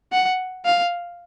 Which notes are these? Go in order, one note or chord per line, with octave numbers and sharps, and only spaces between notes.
F#5
F5